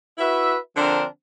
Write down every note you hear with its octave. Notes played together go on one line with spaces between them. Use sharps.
E4 F#4 B4 E5
D3 F3 C4 D4 A#4 C5